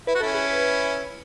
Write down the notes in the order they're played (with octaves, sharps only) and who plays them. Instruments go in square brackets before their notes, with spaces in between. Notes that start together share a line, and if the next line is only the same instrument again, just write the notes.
[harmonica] E4 [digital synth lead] B4
[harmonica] F#4
[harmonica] C#4 E4 [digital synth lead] A4
[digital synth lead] G#4
B4